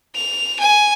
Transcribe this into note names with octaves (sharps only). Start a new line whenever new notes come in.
F7
G#5